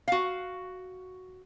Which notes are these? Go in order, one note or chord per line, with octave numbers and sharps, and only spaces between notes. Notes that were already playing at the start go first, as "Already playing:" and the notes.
F#4 F5